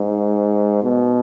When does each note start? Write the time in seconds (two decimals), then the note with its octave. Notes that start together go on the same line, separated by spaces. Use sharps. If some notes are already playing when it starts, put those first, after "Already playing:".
Already playing: G#2
0.83 B2